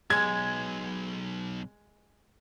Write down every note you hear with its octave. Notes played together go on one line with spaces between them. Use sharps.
B1 G#3 G#6